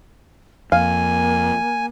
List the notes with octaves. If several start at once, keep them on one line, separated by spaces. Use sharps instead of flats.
F2 A#3 F5 G#5